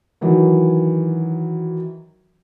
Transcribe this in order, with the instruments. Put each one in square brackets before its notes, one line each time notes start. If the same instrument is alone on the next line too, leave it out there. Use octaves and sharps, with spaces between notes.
[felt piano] D#3 E3 F#3